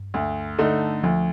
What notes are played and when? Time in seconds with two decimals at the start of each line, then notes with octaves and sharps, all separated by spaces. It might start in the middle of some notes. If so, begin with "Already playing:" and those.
Already playing: G2
0.14 D2
0.59 D3 A3 D#4
1.03 D2 F3